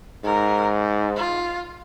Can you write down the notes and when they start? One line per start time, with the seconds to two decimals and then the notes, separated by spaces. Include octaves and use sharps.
0.23 G#2 A#4
1.16 F4